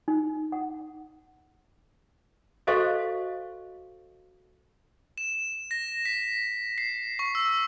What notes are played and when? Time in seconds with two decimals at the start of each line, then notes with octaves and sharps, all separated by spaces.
0.08 D#4
0.52 F#5
2.67 F#4 A4 C5 D#5 F5 C#6
5.18 E7
5.71 A#6
6.05 B6
6.78 C7
7.19 C#6
7.35 E6